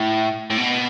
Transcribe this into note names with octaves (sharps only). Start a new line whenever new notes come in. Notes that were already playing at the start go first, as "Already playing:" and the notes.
Already playing: A2
A2
B2